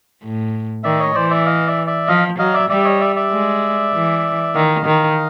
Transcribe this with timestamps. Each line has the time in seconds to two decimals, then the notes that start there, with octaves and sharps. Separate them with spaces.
0.23 A2
0.84 D#3 D5 E5
1.00 C#5 D#5
1.15 E3 C5 D5
1.30 D5 E5
1.46 D#5 F5
1.67 D5 E5
1.87 D5 E5
2.08 F3 D#5 F5
2.39 F#3 D#5 F5
2.54 D5 E5
2.70 G3 D5 E5
2.85 C#5 D#5
3.00 D5 E5
3.16 D5 E5
3.31 G#3
3.93 E3
4.54 D#3 D#5 F5
4.86 D#3